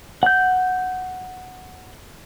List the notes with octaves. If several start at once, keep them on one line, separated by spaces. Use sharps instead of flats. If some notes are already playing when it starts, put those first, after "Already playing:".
F#5 G6